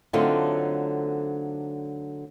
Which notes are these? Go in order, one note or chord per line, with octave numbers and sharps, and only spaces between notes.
D3 F#3 A3 C4 D#4 F4